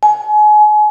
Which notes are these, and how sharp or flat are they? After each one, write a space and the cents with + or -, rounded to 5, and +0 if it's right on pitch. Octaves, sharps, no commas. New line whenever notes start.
G#5 +30